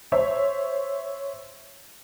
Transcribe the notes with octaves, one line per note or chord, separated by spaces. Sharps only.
C5 C#5 E5